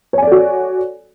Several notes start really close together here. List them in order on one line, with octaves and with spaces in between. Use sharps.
C#5 G#5 D5 A4 F#4